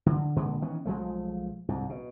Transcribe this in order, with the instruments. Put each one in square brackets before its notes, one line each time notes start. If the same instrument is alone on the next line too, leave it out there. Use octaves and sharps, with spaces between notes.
[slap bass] D3
A#2 D3 G#3
D#3 E3 B3 C#4
B1 F3 G#3 A3
C2 G#2
B2